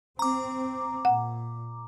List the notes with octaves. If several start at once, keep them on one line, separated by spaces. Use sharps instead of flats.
C4 A#5 D6
A#2 F#5